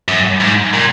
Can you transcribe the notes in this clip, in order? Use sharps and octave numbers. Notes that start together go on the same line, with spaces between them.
F#2
G#2
A#2